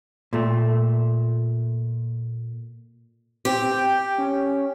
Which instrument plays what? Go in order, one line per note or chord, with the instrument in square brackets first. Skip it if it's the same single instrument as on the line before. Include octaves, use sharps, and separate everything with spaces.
[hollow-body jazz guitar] A#2 A3
[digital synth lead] C4 [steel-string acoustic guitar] G4
[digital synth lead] G5
C#4